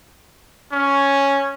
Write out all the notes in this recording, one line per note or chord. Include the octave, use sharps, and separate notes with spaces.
C#4